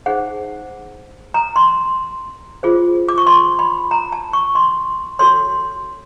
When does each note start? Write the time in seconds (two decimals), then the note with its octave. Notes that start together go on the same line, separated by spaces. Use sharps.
0.06 D#4 G#4 C5 F#5
1.34 A#5
1.56 C6
2.63 F4 G#4 C5
3.08 D6
3.18 C#6
3.27 C6
3.59 B5
3.91 A#5
4.12 A5
4.33 C#6
4.55 C6
5.19 F#4 A4 C#5 C6